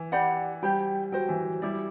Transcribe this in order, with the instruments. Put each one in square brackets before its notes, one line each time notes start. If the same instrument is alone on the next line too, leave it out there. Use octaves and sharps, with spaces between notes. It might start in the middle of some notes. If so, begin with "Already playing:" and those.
Already playing: [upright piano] E3
[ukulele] G4 D5 F#5 B5
[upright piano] G3 [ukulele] G4 C5 G5 B5
[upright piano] F#3 [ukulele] F#4 C5 G5
[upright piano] E3
[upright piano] G3 [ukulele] E4 G4 D5